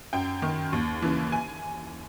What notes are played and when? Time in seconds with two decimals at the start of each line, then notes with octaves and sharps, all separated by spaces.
0.13 F#2 G5
0.42 D#3
0.73 D#2
1.02 C#3 E3
1.32 G#5